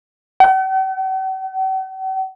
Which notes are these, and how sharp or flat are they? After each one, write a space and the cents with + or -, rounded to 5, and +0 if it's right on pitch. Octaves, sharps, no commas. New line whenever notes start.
F#5 +45